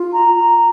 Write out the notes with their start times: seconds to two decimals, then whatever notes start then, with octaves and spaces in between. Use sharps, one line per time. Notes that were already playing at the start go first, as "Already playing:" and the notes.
Already playing: F4
0.13 A#5
0.36 A#5